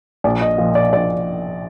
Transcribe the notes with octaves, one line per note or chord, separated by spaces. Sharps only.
A#1 D5
D#5
A#2 F3
D5
A#1 D5